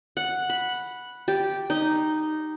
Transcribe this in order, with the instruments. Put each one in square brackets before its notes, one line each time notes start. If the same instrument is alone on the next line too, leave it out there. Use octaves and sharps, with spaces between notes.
[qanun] F#5
B5
G4
D#4